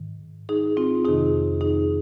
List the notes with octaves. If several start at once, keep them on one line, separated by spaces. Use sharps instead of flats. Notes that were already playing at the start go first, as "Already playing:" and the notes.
Already playing: G#2 D#3
D#4 G#4
C4 F4
F2 C3 D#3 D#4 G#4
D#4 G#4